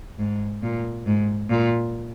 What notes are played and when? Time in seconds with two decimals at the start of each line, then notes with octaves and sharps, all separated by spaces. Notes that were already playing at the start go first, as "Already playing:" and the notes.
0.19 G#2
0.63 A#2
1.06 G#2
1.50 A#2